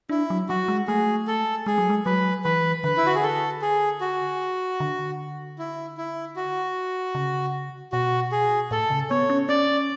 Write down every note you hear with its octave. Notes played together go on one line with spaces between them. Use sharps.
D4 E4
F#3
F#3 F#4
G#3
A3 G#4
A4
G#3 G#4
F#3
G#3
F#3 B4
E3 B4
D3 B4
E4
F#4
G#4
A4
G#4
F#4
D3
E4
E4
F#4
C#3
B2 F#4
G#4
A2 A4
C#3
B3 C#5
C#4
C#4 D5